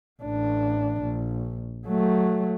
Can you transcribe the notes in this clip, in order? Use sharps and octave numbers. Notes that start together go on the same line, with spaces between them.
A1 D4
A#1
F#3 A3